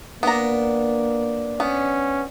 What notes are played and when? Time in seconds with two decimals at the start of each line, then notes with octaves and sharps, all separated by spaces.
0.23 A#3 B3 D4 A#5
1.60 B3 C#4